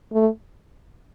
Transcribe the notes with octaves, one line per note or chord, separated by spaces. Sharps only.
A3